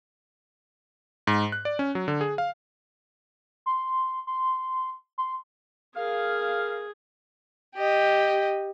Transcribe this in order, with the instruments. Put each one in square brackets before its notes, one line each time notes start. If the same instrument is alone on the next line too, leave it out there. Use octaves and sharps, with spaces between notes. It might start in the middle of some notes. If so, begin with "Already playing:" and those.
[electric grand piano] G#2
F#6
D5
C#4
F#3
D3
G#4
F5
[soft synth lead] C6
C6
C6
[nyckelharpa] G#4 [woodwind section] A#4 F5
[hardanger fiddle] G4 D#5